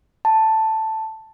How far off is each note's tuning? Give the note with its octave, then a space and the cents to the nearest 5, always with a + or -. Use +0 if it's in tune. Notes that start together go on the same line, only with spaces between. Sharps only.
A5 +5